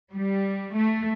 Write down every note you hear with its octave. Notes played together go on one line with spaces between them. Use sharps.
G3
A3